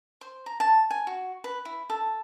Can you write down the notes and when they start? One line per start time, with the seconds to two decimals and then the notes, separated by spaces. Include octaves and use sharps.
0.21 C5
0.46 A#5
0.60 A5
0.91 G#5
1.07 F#4
1.44 B4
1.65 E4
1.90 A4